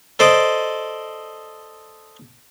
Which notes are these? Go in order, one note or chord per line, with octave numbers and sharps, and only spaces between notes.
A4 C5 D5 D#5 D6 D#6